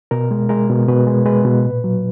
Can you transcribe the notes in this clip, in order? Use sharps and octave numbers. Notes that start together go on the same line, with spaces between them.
B2 A#4
G#3
G#3 A#4
B2
B2 B4
G#3
G#3 B4
B2
A#2
F#3